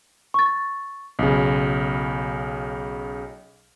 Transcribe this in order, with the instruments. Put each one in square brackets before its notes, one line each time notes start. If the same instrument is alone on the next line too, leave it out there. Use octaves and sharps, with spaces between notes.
[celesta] C#6 A6
[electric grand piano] B1 C#3